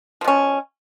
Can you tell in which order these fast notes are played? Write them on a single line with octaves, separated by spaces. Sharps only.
F3 B2 C#4